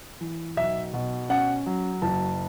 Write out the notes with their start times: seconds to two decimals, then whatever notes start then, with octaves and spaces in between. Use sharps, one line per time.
0.21 E3
0.57 B1 E5
0.94 B2
1.29 C#4 F#5
1.66 F#3
2.02 F#1 A5